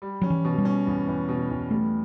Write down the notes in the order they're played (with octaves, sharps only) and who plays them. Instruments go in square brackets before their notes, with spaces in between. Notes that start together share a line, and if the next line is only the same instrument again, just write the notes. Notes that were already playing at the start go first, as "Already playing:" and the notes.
[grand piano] G3
[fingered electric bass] F#3 [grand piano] C#4
[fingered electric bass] E3
[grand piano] B2
[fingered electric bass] G3
[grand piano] C#4
E2
E2
B2
E2
[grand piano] G3 [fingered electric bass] A3